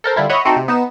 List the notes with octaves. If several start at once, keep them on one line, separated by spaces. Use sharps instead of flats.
A4 A#4 C5
D3 G3 E4 F4
C#5 D#5 E5 F#5 B5
A3 C4 D#4 F#4 A4
C3
B3 D#4 E7